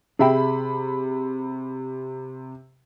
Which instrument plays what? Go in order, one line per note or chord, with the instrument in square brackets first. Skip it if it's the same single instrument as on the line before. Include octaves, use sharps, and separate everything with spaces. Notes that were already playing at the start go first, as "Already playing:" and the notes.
[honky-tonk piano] C3 B5 [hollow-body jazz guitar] G#4 E5 G5